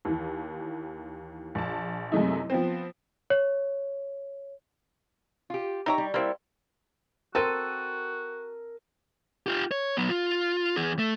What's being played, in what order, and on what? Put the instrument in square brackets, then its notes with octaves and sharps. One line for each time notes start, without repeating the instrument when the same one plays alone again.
[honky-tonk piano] D#2 E3
A#1 A5
F#2 C3 G#3 A3 D#4 E4
F3 B3 C4
[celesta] C#5
[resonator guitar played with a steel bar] F4 G4
[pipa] D#4 G4 A#5 [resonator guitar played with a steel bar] C#5 E5
[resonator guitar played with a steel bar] G3
[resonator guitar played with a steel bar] G3 E4 [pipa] A#3 C4
[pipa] C4 A4 [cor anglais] F#4 [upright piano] A#4 D#7
[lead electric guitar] F4 G4
C#5
F#3 B3
F4
E2 G#4
A3